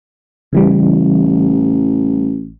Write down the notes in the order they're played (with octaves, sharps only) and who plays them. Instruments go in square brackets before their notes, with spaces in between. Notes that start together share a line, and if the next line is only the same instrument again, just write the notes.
[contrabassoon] A1 [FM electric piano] C#3 E3 G3